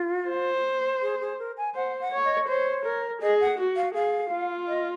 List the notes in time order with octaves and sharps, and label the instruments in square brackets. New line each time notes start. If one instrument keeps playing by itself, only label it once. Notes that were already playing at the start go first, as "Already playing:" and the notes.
Already playing: [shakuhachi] F4
[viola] C5
[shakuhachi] G#4
G#4
A#4
G#5
[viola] C5 [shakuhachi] F#5
[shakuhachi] F#5
[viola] C#5
[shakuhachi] D#5
[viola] C5 [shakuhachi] C#5
[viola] A#4
[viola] G#4 [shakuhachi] D#5
[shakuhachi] F#5
[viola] F#4
[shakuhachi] F5
[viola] G#4 [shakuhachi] F5
[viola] F4
[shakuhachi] D#5